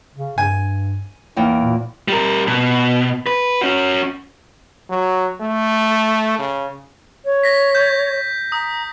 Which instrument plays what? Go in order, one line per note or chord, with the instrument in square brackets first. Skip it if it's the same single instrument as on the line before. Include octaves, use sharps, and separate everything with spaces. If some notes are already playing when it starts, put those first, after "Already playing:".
[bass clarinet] C#3
[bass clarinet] G2 [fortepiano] G#5
[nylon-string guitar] E2 A#3 G5 [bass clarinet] D#4
[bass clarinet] A#2
[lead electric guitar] G3 A#4
B2
B4
C#4 F#4
[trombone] F#3
A3
C#3
[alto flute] C#5
[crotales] A#6 B6
G6
[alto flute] A#5 [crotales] D#6